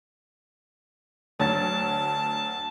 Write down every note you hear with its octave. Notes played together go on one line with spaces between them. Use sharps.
D2 F#3 A5 A6